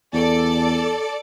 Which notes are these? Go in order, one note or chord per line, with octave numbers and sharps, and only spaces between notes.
E2 A4 D5